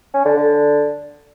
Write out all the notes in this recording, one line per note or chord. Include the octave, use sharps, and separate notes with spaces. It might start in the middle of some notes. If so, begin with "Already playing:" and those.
C#4
D3
D3